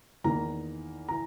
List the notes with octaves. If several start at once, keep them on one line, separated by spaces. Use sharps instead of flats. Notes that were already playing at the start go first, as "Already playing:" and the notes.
E2 D#3 A#3 A#5
E3 A#5